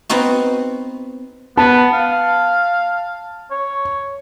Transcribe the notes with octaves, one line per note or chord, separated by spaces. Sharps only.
B3 C4 D#4 F#4
B3 A5
F5
C#5